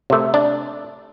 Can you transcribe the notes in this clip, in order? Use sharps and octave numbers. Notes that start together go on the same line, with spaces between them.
C3 A3
D4